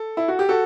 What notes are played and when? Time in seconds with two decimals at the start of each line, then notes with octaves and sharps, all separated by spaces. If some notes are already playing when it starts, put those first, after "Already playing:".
Already playing: A4
0.17 E4
0.28 F#4
0.39 G4
0.49 F#4 A4